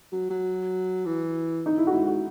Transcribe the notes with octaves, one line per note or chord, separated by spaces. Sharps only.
F#3
F#3
E3
D#4
E4
F#4
G#2 E4
F#4